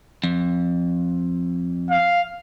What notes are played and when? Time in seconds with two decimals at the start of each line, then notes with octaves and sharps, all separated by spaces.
0.24 F2
1.90 F5